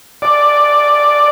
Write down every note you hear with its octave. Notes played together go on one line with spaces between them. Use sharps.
D5